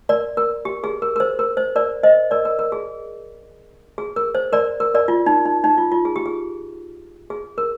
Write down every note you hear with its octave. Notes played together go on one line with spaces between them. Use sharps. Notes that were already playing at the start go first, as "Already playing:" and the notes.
A#4 D5
A#4
G4
G#4
A#4
A#4
C5
A#4
C5
A#4 D5
C5 D#5
A#4 D5
A#4
A#4
G#4
G#4
A#4
C5
A#4 D5
A#4
A#4 D5
F4
D#4
D#4
D#4
F4
F4
G#4
G4
G#4
G#4
A#4